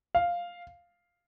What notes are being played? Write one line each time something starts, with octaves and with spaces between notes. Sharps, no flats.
F5